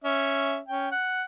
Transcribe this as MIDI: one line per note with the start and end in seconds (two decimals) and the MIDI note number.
0.04 0.58 61
0.04 0.58 76
0.68 0.89 61
0.68 0.89 79
0.92 1.23 78